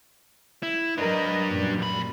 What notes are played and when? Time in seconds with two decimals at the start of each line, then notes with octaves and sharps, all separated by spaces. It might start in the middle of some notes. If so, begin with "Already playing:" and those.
0.63 E4
0.98 F#3 D4 A#4 B4 D#5
1.48 F#2 A#2 G3
1.78 F2 B5